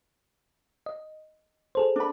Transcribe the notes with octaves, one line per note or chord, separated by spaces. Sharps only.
D#5
G#4 A4 C5
D4 B5